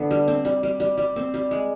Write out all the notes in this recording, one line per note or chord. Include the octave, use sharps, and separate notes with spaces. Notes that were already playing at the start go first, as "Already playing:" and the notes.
Already playing: D3 B3
G3
C4
G3
G3
G3
G3
C4
G3
G#3